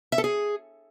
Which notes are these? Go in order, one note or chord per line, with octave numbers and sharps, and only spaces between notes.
E5
A4
G#4